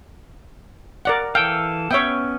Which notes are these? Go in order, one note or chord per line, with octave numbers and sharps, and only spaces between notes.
A#4 D5 F#5
E3 A4 F5 G5
B3 C#4 C#5 E5 G5